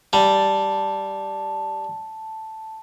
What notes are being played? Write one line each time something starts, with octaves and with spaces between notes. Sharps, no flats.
G3 A5